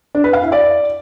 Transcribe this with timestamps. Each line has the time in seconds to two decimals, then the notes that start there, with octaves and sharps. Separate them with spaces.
0.15 D4
0.24 B4
0.33 F5
0.43 E4
0.52 D5